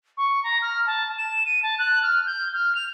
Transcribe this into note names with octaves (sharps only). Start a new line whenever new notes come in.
C#6
A#5
F6
A5
E7
D#7
A5
F#6
F6
G6
F6
F7